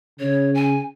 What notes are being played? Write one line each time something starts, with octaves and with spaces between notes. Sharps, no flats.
C#3 C#5
G#5